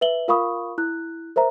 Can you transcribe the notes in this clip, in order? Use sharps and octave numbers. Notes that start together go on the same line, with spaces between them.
B4 E5 F#7 G7
F4 A#4 F5 B5 C#6 D#6
E4 F#6
A#4 C5 E5 A#5